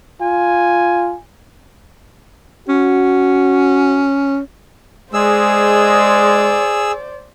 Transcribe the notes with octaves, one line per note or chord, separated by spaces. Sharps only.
F4 G#5
C#4 F#4
G#3 G#4 C5 D5 E6